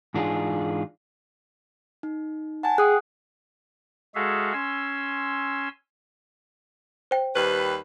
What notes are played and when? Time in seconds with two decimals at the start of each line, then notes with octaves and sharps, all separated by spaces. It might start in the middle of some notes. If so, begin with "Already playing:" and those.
0.14 G#2 E3 D4 D#4 F4 G#4
2.03 D#4
2.63 F#5 G#5 A5
2.78 G#4 G5 D#6 F#6
4.15 G#3 F#4 G#4 A4 E5 F5
4.53 C#4 G#5 C6 E6
7.11 C5 G5
7.35 D#2 G3 B4